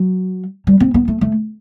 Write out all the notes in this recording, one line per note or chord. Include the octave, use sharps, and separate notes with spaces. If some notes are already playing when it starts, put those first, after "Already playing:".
Already playing: F#3
G3
C4
B3
A3
A3